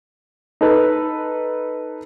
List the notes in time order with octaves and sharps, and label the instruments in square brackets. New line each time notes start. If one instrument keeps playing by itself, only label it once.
[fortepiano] D#4 A4 B4